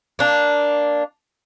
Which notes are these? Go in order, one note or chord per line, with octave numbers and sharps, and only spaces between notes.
A#3 D4